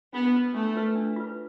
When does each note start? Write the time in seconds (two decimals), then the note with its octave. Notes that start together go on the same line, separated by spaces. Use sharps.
0.13 B3 D4
0.34 F4 B4
0.54 A3 D4
0.75 F4 B4
0.95 D4
1.16 F4 B4